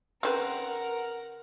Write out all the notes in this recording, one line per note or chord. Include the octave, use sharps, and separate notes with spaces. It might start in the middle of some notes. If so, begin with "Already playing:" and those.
C#3 C4 A#4 B4 F#5